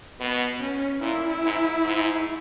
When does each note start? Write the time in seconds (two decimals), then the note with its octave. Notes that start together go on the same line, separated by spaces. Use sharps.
0.21 B2 B3
0.61 C#4
1.02 A#2 E4
1.43 G#2
1.84 G#2